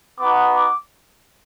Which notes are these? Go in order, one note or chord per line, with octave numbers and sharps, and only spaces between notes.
B3 D#4 F#4 D6
D6